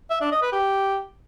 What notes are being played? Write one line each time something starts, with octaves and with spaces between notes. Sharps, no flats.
E5
D4
D#5
B4
G4